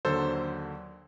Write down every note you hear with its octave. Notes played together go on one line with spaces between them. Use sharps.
D#2 D3 F#3 A4 C5